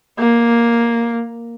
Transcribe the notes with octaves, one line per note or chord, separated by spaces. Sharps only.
A#3